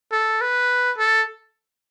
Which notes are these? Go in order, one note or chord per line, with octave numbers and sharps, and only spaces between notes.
A4
B4
A4